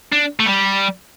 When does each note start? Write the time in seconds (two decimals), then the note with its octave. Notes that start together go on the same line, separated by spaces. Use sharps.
0.12 D4
0.40 A3
0.46 G3